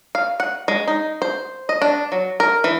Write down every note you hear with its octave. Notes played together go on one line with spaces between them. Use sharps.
F5
F#5
G#3
D#4
C5
D#5
D4
F#3
A#4
E3